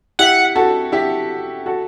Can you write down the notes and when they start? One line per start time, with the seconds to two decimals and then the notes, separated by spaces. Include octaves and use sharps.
0.19 E4 G4 F#5
0.55 F#4 A4
0.92 E4 G4
1.66 F#4 A4